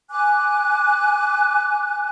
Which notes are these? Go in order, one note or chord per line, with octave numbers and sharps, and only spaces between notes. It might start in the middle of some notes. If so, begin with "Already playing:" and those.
G#5 D6 F#6